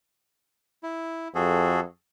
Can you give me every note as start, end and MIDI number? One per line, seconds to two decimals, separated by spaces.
0.83 1.28 64
1.35 1.84 41
1.35 1.80 66
1.35 1.80 68
1.35 1.80 69